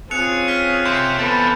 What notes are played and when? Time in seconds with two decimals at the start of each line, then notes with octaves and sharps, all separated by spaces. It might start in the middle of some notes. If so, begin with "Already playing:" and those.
0.11 C4 C#4 F4 G#4 F#6 C#7 F7
0.48 F6 B6
0.85 C3 G6
1.19 E3 B3 C4 A4